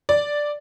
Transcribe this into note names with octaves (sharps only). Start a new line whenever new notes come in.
D5